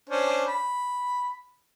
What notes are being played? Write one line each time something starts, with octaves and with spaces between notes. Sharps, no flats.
C#4 D4 C5
B5